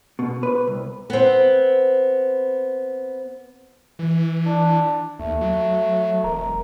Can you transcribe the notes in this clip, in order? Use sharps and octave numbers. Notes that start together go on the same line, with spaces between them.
B2
B4
C2
B3 C4
E3
D4
D#2 A3
F#3
E1 A#4